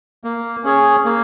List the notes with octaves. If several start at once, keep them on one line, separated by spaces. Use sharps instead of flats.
A#3
C#4 G#4 C#5
A#3